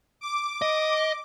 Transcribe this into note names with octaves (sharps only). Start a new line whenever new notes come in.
D6
D#5